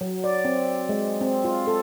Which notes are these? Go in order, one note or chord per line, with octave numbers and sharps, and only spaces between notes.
F#3
D5
C4
G#3
C4
F4
A4